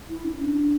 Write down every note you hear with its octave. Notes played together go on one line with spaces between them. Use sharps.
E4
C#4
D4